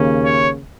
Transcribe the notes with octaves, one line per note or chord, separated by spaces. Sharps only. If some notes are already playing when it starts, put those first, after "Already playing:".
Already playing: D#2 C#3 A#3 C#4
C#5